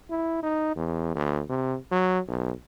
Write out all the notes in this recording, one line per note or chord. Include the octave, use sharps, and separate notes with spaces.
E4
D#4
E2
D2
C3
F#3
B1